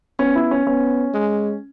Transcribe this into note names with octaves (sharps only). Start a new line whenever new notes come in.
B3 C#4
E4
C#4
B3 C#4
G#3